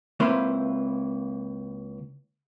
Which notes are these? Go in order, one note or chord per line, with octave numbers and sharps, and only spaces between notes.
C#2 A#3 C4 E4 B4 C5